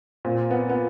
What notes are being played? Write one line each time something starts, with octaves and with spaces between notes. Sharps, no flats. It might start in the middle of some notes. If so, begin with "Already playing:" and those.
A#2 C4
B3
B3